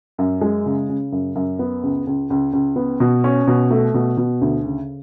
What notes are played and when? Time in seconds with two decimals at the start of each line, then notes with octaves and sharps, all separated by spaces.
0.18 F#2
0.41 G#3
0.66 C#3
0.89 C#3
1.12 F#2
1.35 F#2
1.59 B3
1.83 C#2
2.07 C#2
2.30 C#2
2.53 C#2
2.76 B3
3.00 B2
3.24 C#4
3.47 B2
3.70 A3
3.94 B2
4.17 B2
4.41 D2
4.64 C#3